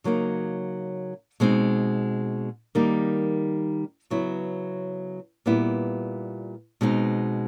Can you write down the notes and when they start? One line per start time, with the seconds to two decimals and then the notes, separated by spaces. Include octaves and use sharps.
0.04 C#3 F#3 A#3 D#4
1.40 B2 G#3 C4 D#4
2.75 D#3 G3 A#3 D#4
4.10 C#3 F#3 B3 E4
5.46 A#2 G3 B3 E4
6.81 B2 G#3 C4 D#4